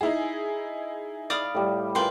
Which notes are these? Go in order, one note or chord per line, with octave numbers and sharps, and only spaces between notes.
D#4 E4 G#4
D5 F5 B5 D#6
A2 G3
F4 G#4 A#4 B4 G5 C6